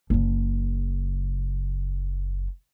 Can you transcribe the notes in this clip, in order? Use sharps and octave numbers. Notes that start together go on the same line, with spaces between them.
F#1 C#3